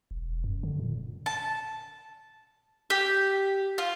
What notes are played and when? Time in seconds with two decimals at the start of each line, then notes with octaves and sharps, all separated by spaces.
0.11 E1
0.44 F#2
0.63 D3
0.79 A#2
1.26 A5
2.90 G4
3.78 F4